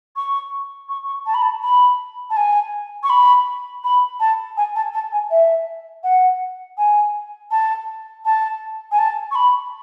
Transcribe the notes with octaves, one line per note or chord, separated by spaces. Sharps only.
C#6
C#6
C#6
A5
B5
A5
B5
A5
G#5
C#6
B5
B5
A5
G#5
A5
A5
G#5
E5
F#5
G#5
A5
A5
G#5
A5
C#6
B5